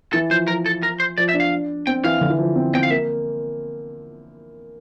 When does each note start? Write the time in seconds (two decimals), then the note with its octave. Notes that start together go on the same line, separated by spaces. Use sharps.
0.13 E3 A4
0.30 F3 C5
0.48 F3 A#4
0.66 A4
0.83 A#4
1.00 C5
1.18 F3 D5
1.29 E5
1.34 D4
1.40 F5
1.87 C4 G5
2.04 E3 F5
2.21 D3
2.30 E3
2.39 F3
2.55 C4
2.73 C4 G5
2.83 F5
2.90 A#3 E5